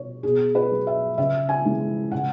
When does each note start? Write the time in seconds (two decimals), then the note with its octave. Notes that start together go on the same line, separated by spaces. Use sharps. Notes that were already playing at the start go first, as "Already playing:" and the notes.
Already playing: B2 C#5
0.23 B2 G#4
0.55 B4
0.71 F#3
0.87 E5
1.18 C#3 E5
1.49 G#5
1.65 E3 G#3
2.11 C#3 F#5